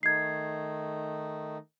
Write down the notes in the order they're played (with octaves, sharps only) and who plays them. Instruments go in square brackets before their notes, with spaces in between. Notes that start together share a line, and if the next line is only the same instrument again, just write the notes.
[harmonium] D#3 A3 D#4 [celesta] G#6 C7